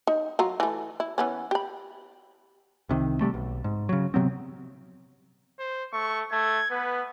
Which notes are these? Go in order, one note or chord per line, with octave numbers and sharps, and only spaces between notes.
D#4
F#3 F4 A#5
E3 A3
E4
E3 B3 C#4
G4 B5
C2 C3 D#3
C3 F#3 G3 A3
B1
G#2
C#3 F#3
C3 F#3 B3 C4
C5
A3 C#6
A3 G#6
B3 B4